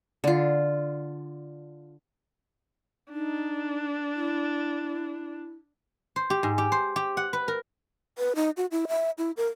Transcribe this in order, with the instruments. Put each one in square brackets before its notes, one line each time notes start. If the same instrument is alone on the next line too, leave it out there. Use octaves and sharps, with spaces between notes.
[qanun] D3 F4
[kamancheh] D4 [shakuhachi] D#4
[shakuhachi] E4
[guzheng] C5
G4
G#2
G4
C5
G4
F#5
B4
A#4
[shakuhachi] B4
D#4
F#4
E4
E5
E4
A#4